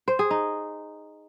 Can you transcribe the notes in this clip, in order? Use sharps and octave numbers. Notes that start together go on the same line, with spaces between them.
C5
G#4
D#4